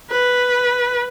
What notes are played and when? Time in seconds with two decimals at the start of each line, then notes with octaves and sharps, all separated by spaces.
0.11 B4